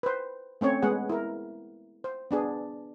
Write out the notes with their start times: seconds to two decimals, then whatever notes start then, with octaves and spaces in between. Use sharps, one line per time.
0.03 B4 C5
0.61 A3 C4 C#4 C#5
0.82 G#3 B3 G#4 F#5
1.09 E4 A#4
2.04 C5
2.31 B3 D4 G#4